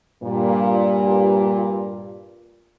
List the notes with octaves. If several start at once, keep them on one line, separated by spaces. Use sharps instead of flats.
G2 A#2